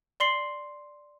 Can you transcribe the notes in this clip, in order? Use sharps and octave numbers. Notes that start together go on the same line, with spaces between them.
D5 C6 C7 F#7